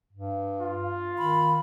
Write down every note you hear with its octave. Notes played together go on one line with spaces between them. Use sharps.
G2
F4
D#3 B5